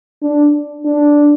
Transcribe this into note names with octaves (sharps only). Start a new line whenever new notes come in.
D4
D4